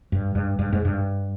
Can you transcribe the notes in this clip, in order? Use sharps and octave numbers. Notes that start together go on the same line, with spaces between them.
G2
G2
G2
G#2
G2